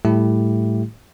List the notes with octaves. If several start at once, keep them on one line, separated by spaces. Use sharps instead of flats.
A2 G3 A3 E4 G4